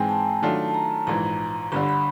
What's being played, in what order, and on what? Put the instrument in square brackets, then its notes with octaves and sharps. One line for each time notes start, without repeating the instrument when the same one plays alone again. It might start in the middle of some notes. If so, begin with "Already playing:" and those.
Already playing: [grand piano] G#2 E3 G#3 C4 [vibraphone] G5 G#5
[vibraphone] A5
[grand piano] D#3 F#3 A3 D4 F4
[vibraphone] A5
A#5
[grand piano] A#1 G#2 E3 [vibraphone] A#5
[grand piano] G1 G2 D3 [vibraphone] B5
[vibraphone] B5